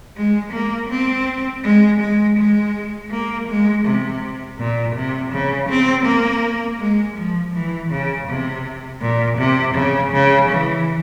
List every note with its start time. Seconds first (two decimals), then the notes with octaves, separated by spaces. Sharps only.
0.17 G#3
0.53 A#3
0.89 C4
1.64 G#3
2.00 G#3
2.37 G#3
3.11 A#3
3.48 G#3
3.85 C3
4.59 A#2
4.96 C3
5.33 C#3
5.69 C4
6.06 A#3
6.80 G#3
7.17 F3
7.54 E3
7.91 C#3
8.28 C3
9.01 A#2
9.38 C3
9.75 C#3
10.12 C#3
10.49 E3